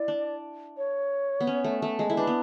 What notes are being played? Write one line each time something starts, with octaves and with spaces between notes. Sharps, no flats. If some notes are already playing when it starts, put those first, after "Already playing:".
Already playing: E4 D5
D4
C#5
B3
C#4
A3
A3
G#3
E4 A4
D4 B4
B3